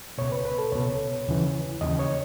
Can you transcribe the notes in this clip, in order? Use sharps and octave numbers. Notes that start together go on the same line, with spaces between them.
C#2 B2 C#5
B4
B4
A4
C#2 B2 C#5
D#2 C#3 E3
D#2 C#3 E3 D#5
C#5